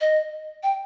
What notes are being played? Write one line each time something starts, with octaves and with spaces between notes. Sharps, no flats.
D#5
G5